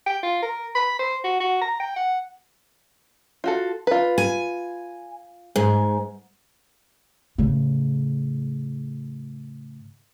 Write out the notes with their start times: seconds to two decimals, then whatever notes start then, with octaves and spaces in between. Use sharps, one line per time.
0.06 G5
0.23 F4
0.42 A#4
0.75 B5
0.99 C5
1.24 F#4
1.40 F#4
1.61 A#5
1.80 G5
1.96 F#5
3.44 F4 F#4 A4
3.87 F4 B4
4.18 G#5
5.56 G#2 G#4
7.38 A2 C#3